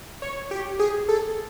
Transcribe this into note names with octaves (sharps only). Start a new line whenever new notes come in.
C#5
G4
G#4
A4